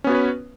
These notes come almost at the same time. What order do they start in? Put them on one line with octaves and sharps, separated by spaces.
C#4 B3 F#4 C#5 B4